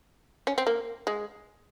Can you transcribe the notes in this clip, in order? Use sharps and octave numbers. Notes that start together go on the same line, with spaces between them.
C#4
C4
A#3
G#3